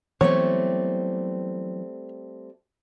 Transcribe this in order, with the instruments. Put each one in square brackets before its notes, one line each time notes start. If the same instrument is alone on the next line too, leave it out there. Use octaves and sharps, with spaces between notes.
[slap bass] E3 F#3 B3 [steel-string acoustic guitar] G3 A3 C4 [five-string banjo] C#5